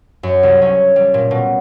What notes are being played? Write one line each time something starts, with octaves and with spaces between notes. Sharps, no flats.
F#2
C2
C#4
G3
A#2
B2